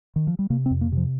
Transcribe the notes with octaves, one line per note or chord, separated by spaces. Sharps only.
D#3
F3
G3
C3 A#3
C4
F2
A#3
C3 F3